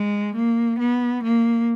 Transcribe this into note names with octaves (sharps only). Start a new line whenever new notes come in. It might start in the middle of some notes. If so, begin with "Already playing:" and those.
Already playing: G#3
A#3
B3
A#3